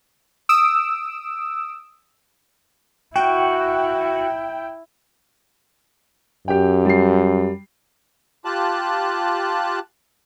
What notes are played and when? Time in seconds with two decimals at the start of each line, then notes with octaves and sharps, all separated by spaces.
0.49 D#6 E6 D7 E7
3.16 E4 F#4 G5
6.48 F#2 G4 G5
6.85 G3 C7
8.45 F4 G4 A5 F#6